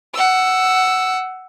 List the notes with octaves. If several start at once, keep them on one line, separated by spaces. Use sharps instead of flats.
F#5 E6